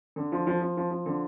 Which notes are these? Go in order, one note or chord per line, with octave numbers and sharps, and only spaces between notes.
D3
F3
F3
F3
F3
F3
D3